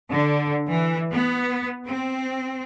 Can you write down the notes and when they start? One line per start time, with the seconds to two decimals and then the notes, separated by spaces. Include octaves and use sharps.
0.11 D3
0.69 E3
1.11 B3
1.86 C4